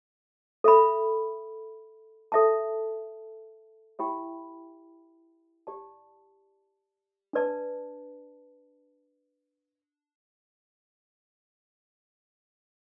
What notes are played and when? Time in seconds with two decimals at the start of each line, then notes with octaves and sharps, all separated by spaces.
0.64 A4 E5 B5
2.32 A4 E5 A5
3.99 E4 G4 E5 G5 B5
5.67 G4 D5 A5
7.33 D4 B4 D5 A5